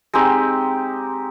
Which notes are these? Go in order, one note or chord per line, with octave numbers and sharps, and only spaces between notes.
G#3 C4 D#4 G4